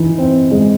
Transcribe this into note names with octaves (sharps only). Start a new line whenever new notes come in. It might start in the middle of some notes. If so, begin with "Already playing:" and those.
Already playing: E3 D#4
C4
G#3